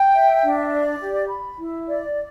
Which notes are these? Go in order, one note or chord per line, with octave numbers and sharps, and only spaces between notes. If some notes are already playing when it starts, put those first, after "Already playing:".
Already playing: G5
E5
D4
D5
G4
B5
E4
D5